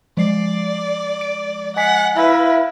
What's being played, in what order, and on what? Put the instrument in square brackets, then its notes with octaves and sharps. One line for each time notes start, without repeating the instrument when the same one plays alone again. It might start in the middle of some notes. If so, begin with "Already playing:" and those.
[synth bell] F3 G#3 C7 [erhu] D5
[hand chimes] D7
[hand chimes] D#5 G#5 B6 [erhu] F#5
[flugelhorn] E4 [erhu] B4 [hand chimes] E5 F5